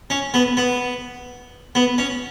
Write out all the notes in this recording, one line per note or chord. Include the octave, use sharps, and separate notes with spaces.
C#4
B3
B3
B3
C#4